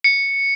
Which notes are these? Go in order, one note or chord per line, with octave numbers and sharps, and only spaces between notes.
C#7